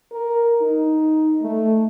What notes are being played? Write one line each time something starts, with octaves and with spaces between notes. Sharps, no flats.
A#4
D#4
A3